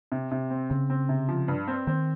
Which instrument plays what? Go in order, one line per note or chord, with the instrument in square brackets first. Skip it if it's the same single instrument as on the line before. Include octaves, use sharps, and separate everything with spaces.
[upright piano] C3
C3
C4
[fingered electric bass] C#3 [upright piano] C4
[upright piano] C4
C3
F3
G2
C4
[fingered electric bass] D#3 [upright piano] C4